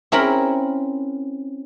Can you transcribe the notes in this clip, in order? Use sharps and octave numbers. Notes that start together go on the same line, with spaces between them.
C4 C#4 E4 A#4 G5 B5